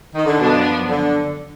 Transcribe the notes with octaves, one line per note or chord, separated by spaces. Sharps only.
D#3
D3
F#2 B2 F3 B3 D4
D3